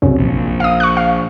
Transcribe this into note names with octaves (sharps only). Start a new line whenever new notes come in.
C2 F#2 C#3
A#1
F5 D#6
C#6 F#6
F5